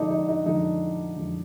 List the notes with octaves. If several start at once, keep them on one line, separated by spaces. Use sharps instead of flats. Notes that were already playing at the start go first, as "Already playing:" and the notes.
Already playing: F2 D3 G#3 D4 D#4
D#4
D#4
F2 D3 G#3 D#4
F2 D3 G#3